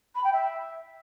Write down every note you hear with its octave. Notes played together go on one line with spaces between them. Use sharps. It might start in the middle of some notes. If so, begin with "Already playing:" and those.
B5
G5
E5